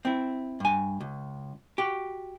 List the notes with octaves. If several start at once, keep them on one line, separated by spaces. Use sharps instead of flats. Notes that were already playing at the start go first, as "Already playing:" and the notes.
C4 E4
G2 G#5
C#2
F#4 G4